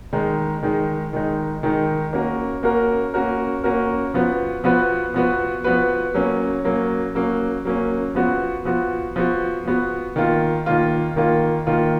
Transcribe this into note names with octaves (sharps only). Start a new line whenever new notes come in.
D#3 G#3 D#4
D#3 G#3 D#4
D#3 G#3 D#4
D#3 G#3 D#4
A#3 C#4 F#4 A#4
A#3 C#4 F#4 A#4
A#3 C#4 F#4 A#4
A#3 C#4 F#4 A#4
F3 B3 F#4 B4
F3 B3 F#4 B4
F3 B3 F#4 B4
F3 B3 F#4 B4
F#3 A#3 C#4
F#3 A#3 C#4
F#3 A#3 C#4
F#3 A#3 C#4
F3 B3 F#4
F3 B3 F#4
F3 B3 F#4
F3 B3 F#4
D#3 A#3 F4
D#3 A#3 F4
D#3 A#3 F4
D#3 A#3 F4